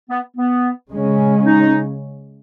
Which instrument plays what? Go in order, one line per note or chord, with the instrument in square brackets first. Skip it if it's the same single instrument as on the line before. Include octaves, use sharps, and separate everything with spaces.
[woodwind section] B3
B3
[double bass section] C#3 G#3 C#4
[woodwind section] D#4